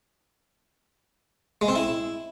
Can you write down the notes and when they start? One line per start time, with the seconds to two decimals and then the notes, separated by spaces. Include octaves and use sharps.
1.61 G#3
1.68 C4
1.75 E4